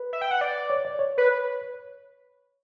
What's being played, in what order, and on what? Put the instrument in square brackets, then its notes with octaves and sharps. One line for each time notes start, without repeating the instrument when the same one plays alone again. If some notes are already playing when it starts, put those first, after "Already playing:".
Already playing: [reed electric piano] B4
[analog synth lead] E5
G5
F#5
D5
[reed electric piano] C#5
D5
C#5
[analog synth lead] B4